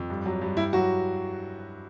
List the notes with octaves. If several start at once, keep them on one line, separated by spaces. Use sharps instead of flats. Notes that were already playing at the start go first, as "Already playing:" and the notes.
Already playing: F2
G2
F#3
G2
G2 E4
F#3 F#4